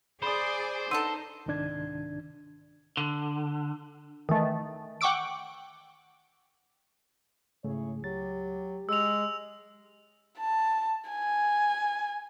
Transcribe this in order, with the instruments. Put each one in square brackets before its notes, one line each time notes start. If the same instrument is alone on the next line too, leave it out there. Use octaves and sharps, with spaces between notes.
[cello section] G#4 D5 [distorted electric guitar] C5 [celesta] B5 D#6
[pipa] B3 D4 A4 [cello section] D#4 [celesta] C6 E6 D#7
[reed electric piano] C2 G#2 C3 D#3 D4 G#6
[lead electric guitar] D3
[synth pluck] D#3 E3 A3
F#5 G5 C#6 D6 E6 D7
[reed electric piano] G#2 C#3 A3 [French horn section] E4 G#4 C#5
[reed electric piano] C#2 A6 [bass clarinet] F#3 [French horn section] G4
[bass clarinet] G#3 [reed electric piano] G#4 [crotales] E6 F7
[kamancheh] A5
G#5